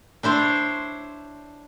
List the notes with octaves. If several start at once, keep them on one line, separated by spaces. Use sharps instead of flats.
D4 E4 C5 C#5